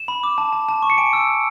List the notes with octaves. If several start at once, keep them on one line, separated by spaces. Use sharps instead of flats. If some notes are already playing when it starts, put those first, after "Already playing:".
Already playing: E7
B5
D6
A5
A5
A5
C#6
C#7
G#5 D7
E6
E6